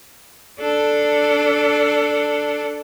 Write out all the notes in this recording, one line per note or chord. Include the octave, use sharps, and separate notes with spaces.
D4 A4